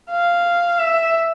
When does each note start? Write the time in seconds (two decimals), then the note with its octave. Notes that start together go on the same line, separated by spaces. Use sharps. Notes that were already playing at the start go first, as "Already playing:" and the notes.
0.11 F5
0.79 E5